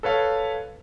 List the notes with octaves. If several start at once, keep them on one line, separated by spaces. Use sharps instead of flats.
A4 B4 C#5 F5